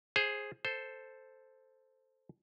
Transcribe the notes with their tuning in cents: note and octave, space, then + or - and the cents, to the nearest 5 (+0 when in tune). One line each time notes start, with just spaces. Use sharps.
G#4 +0 C5 +20
A4 +0 C5 +0